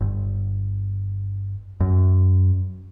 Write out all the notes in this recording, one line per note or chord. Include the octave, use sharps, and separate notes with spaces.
G1
F#2